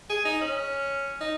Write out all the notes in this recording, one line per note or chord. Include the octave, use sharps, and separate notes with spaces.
G#4
D#4
C#4
D#4